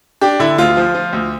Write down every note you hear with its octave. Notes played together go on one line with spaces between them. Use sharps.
D4 G4
D3 E4
D2 F4
F3
F3
D2